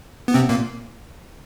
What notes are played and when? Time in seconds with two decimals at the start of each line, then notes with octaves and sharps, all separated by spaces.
0.28 B3
0.34 C3 C4
0.49 A#2 A#3